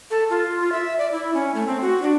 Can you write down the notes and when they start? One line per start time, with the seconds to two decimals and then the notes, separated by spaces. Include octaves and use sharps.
0.11 A4
0.30 F4
0.60 F4
0.72 E5
0.98 D5
1.12 E4
1.34 C#4
1.55 A3
1.67 C4
1.81 F#4
2.02 D4